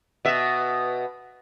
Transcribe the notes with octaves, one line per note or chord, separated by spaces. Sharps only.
B2 E5